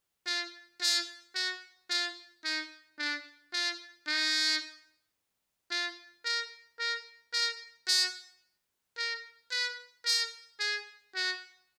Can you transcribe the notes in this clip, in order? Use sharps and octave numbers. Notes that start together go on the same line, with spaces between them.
F4
F4
F#4
F4
D#4
D4
F4
D#4
F4
A#4
A#4
A#4
F#4
A#4
B4
A#4
G#4
F#4